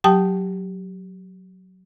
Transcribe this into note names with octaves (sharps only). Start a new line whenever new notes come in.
F#3 G4 G5 A5 D#6